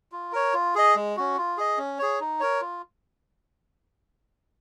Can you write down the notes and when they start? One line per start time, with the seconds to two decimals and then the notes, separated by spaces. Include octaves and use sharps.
0.12 F4
0.33 A#4 C#5
0.54 F4
0.75 G#4 D#5
0.96 G#3
1.17 C#4 F#4
1.37 F4
1.58 G#4 D#5
1.78 C#4
1.99 G#4 C#5
2.20 D#4
2.40 A#4 C#5
2.61 F4